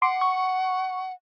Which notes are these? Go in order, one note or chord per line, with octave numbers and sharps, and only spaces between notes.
F#5 C6 D6
C#6